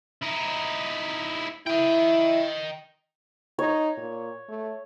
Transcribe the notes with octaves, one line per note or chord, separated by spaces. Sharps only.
D#4 E4
E4 D#5 G5
D#4 C#5
A#2
A3